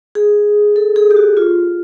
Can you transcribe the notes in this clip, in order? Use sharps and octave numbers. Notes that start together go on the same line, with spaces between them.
G#4
A4
G#4
G4
F#4
F4